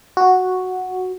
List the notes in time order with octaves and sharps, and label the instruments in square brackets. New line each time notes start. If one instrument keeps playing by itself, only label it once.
[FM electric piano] F#4